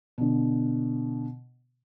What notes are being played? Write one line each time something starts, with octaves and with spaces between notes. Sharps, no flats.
B2 D3